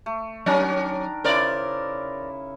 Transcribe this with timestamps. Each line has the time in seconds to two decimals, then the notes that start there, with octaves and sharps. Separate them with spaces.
0.06 A3
0.46 D#3 F#3 C#4 D4 A#4
1.24 C#3 E4 A#4 C5 D5